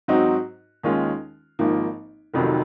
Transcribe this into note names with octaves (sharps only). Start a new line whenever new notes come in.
G#2 F#3 C4 D#4 F#4
D#2 D#3 G#3 C#4 F4
G#1 G#2 F3 A#3
F1 F2 C3 D#3 F#3